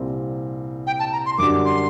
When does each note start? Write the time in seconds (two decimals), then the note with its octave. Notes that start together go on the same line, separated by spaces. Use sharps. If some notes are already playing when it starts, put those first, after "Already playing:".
Already playing: C2 A#2 G3 C4
0.87 G5
0.99 A5
1.12 A#5
1.26 C6
1.38 F#2 D3 G3 D4 F#4 D6
1.65 C6